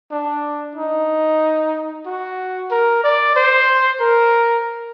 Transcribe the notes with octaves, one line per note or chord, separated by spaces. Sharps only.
D4
D#4
F#4
A#4
D5
C5
A#4